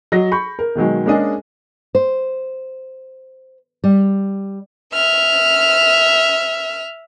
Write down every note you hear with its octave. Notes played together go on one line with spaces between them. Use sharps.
F#3 D#5 A#6
B5 C#6 G6
A#4
B2 D#3 F#3 G#3
G#3 A#3 C#4 D4 G#4 D#5
C5
G3
E5 F6